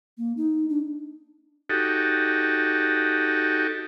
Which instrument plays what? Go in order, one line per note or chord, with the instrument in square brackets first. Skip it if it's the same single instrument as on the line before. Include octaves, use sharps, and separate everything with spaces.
[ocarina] A#3
D#4
D4
[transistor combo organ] D#4 F#4 G4 A4